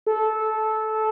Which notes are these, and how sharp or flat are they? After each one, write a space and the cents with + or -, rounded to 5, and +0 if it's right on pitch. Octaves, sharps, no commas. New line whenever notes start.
A4 -15